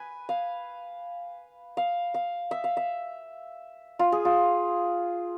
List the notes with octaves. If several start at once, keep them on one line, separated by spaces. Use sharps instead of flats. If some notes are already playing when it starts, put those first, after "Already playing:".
Already playing: B4 G#5
F5
F5
F5
E5
F5
E5
F4
G#4
F4